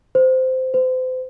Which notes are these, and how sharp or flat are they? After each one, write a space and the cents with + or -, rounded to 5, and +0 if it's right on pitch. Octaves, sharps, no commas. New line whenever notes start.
C5 -15
C5 -35